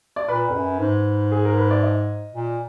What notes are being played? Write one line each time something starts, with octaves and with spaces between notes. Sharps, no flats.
D5
A#2 B4
F2
F#2
G#2
G#4
A#4
B4
D5
D#5
A#2